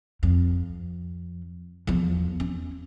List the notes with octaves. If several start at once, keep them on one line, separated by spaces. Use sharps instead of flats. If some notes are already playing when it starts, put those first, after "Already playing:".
F2
E2 F3
C#4